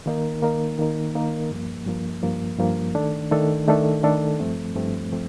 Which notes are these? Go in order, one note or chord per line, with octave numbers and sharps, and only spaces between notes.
D#3 A#3 D#4 A#4
D#3 A#3 D#4 A#4
D#3 A#3 D#4 A#4
D#3 A#3 D#4 A#4
G2 F3 A#3
G2 F3 A#3
G2 F3 A#3
G2 F3 A#3
D#3 A3 D4 A4
D#3 A3 D4 A4
D#3 A3 D4 A4
D#3 A3 D4 A4
G2 F3 A3 C4
G2 F3 A3 C4
F3 A3 C4